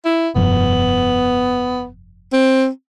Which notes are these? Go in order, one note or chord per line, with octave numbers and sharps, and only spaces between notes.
E4
F1 G2 F3 B3
C4